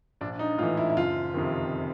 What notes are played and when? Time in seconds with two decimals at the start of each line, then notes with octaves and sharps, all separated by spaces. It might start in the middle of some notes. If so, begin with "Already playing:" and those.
0.21 A#1 D4
0.39 D#4
0.58 A2 F4
0.63 E3
0.77 E4
0.90 E4
0.96 F#1 F4
1.34 F2 C3 D#3